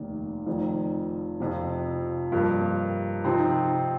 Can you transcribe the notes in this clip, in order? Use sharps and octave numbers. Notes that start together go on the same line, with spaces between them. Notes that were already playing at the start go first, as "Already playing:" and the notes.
Already playing: F1 D#2 D#3
F1 F2 D#3
F2 C3 F3
G2 F3 A#3
C3 F3 C4 D#4